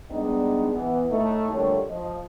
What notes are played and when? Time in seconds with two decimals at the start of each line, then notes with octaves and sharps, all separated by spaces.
0.11 G3 G#3 B3 D4 D#4
0.71 E3 B3
1.10 A2 A3 D#4
1.51 F2 D3 G3 A3 A#3 C#5
1.90 F3 D#5